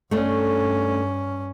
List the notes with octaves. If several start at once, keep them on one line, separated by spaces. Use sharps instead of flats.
G2 A3 C#4 D4